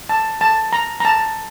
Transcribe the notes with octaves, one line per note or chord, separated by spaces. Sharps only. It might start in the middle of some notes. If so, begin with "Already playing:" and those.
A5
A5
A#5
A#5
A5